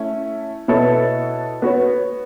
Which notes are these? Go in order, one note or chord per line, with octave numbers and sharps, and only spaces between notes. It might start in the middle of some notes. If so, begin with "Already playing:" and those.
Already playing: A3 C#4 E4
B2 B3 E4 A4 C#5
B3 F#4 C#5